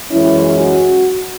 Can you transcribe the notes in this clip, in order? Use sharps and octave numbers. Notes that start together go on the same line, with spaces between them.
F#2 E3 G#3 C#4 E4
F#4